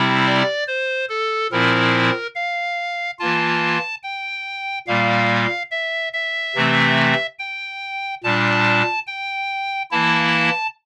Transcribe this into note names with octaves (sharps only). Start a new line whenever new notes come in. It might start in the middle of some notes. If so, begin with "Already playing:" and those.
Already playing: C3 G3 C4 E4
D5
C5
A4
A#2 F3 C4 E4 A#4
F5
E3 A#3 F4 A5
G5
A#2 G3 A#3 F5
E5
E5
C3 E3 A3 C4
G5
A#2 G3 D4 A5
G5
E3 A#3 E4 A5